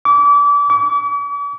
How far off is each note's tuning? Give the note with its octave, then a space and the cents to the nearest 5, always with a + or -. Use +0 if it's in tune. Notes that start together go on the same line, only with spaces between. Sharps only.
D6 -30
D6 -45